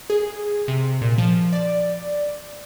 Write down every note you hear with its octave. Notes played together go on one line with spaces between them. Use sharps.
G#4
C3
A#2
F3
D5